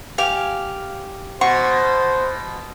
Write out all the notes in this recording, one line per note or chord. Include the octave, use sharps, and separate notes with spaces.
G4 F5 G#5
B2 C5 F#5 C#6